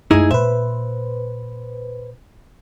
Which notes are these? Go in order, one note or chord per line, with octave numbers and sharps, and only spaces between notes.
F#2 A3 D#4 E4 G#4
A#2 B4 C5 E5